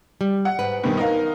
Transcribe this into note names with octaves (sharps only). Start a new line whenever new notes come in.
G3
F#5
G#2 B4
G2 B2 D#3
D#4 A#4 F5